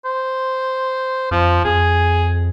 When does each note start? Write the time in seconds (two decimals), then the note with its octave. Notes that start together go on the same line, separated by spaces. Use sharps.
0.05 C5
1.31 F2 F3
1.65 F2 G#4